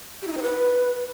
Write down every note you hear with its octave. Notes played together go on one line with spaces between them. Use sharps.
G4
E4
D#4
C5
B4